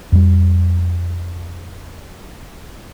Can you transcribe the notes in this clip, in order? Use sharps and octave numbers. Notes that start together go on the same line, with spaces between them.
F2 G3